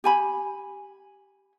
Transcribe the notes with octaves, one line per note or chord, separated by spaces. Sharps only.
G4 G#5 B5